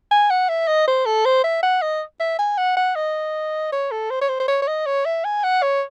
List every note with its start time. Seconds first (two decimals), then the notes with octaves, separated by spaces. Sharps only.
0.11 G#5
0.30 F#5
0.49 E5
0.68 D#5
0.87 C5
1.06 A4
1.25 C5
1.44 E5
1.63 F#5
1.82 D#5
2.20 E5
2.39 G#5
2.58 F#5
2.77 F#5
2.96 D#5
3.72 C#5
3.91 A4
4.10 C5
4.21 C#5
4.29 C5
4.40 C5
4.48 C#5
4.62 C#5
4.68 D#5
4.86 C#5
5.05 E5
5.24 G#5
5.44 F#5
5.62 C#5